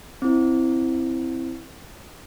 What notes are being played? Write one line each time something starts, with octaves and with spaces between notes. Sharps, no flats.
C4 E4